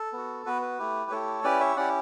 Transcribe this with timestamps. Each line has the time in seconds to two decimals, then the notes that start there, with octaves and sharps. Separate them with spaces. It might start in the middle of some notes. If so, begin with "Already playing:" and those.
Already playing: A4
0.13 B3 F#4
0.46 B3 F#4 B4
0.62 B4
0.79 A3 E4 G4
1.11 A3 E4 G4 A4 C#5
1.44 C#4 E4 G4 B4 D5
1.60 C#5 E5
1.76 C#4 E4 G4 D5 F#5